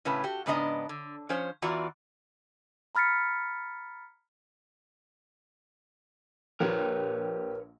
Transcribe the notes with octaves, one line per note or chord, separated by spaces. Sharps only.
A2 C#3 C#4 B4 A5
F#4 G4
G#2 C#3 B3 D4 D#5 A#5
D3
F3 C#4 C5 C#5
E2 E3 F4 F#4 D5 A#5
A#5 B5 F6 A6 B6 C#7
A#1 F3 G4 A#4 B4 C#5